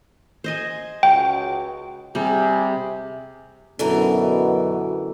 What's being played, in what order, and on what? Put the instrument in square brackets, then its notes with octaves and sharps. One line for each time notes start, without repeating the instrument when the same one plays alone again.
[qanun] C5 D#5 G#5
[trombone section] C#2 F#4 [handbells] G5
[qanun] C3 G3 [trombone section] G4 G#4
[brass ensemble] F#2 B2 [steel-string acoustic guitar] D3 E3 A#4